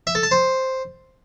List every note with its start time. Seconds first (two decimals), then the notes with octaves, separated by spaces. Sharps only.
0.07 E5
0.15 A4
0.23 A5
0.31 C5